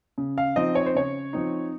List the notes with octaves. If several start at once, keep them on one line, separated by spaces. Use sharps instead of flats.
C#3
F5
F3 C4 D#4 D#5
C#5
C5
C#3 C#5
F3 C4 D#4